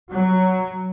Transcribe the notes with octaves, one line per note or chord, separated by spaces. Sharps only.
F#3